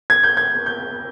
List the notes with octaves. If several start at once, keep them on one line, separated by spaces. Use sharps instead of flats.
G#6
G6
G#6
G6